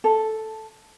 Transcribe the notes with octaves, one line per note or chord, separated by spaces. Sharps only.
A4